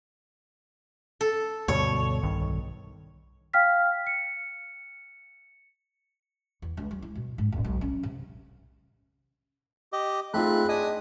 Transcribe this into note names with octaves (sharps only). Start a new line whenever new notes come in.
A4
D2 G2 B2 C#5
B1 G2 D#3
F5 G5 F6 B6
C#7
E2
C#2
G3
E4
B2
G#2
D1
B1
C#4
C3
G4 D#5
A3 C4 D#4 F4 G#4 B5 F#6
D4 D#5 G#5 D#6